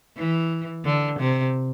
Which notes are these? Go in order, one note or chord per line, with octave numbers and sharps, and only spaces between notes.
E3
D3
C3